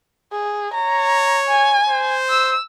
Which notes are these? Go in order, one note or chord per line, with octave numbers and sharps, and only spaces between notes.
G#4
C#5 A#5
G#5
C5
E6